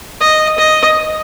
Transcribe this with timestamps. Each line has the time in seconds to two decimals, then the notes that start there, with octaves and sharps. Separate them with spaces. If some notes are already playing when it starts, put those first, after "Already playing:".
0.21 D#5
0.58 D#5